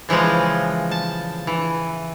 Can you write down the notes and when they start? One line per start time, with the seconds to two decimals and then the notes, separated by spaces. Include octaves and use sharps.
0.09 C#3 E3 F3 G#3
0.91 A5
1.47 E3